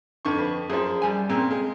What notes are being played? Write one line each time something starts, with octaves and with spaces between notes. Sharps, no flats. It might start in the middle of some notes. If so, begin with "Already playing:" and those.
F2 D3 C#6
B4
F#2 F3 G#4
G3 G#5
A#2 C#3 C4 G#4
G#3